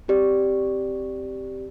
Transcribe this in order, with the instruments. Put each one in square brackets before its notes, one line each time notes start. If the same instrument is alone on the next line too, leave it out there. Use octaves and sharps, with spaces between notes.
[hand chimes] C4 G4 D5